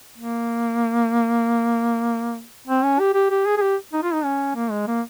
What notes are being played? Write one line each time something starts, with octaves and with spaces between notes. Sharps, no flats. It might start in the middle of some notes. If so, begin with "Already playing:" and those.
A#3
C4
C#4
G4
G4
G4
G#4
G#4
G4
D#4
F4
D#4
C#4
A#3
G#3
A#3